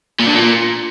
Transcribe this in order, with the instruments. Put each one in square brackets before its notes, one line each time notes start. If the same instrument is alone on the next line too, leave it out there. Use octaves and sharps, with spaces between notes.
[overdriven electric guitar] A#2
D3
A#2